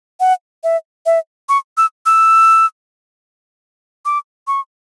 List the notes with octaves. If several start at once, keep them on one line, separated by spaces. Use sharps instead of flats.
F#5
E5
E5
C#6
E6
E6
D6
C#6